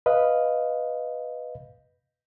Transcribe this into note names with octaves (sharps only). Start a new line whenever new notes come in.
B4 D#5 F5